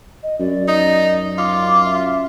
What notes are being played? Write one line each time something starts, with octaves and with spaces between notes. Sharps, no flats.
D#5
F#2 D5
D#4
F4 D6
E5